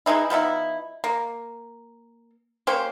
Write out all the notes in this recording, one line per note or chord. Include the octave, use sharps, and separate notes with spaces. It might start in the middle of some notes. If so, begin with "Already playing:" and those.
E3 G#3 D#4 E4
F3 B3 D#4 E4
A#3
A#3 C#4 G4 C5